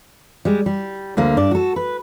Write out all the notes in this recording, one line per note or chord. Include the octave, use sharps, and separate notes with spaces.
G3 G#3
G3
D2 D3 A#3
G2 D4 D5
F#4 A4
B4